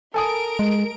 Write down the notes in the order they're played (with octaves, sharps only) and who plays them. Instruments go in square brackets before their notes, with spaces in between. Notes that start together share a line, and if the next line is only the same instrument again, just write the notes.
[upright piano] A4 G#5 D#6 [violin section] A#4 D7
[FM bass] G#3